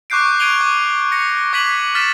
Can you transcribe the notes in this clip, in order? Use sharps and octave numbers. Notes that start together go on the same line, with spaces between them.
C#6 D6 F#6 G6 C7 D7
G#6 D7 D#7 F7 G7
D6
A#6 C#7
D6 G#6 B6 D#7 F#7
F6 A6 B6 D#7 E7